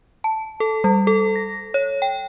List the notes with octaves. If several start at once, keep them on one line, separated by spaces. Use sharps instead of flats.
A5
A4
G3
A4
A#6
C#5
G5